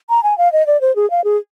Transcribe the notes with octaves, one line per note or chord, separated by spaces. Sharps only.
A#5
G#5
F5
D#5
D5
C5
G#4
F5
G#4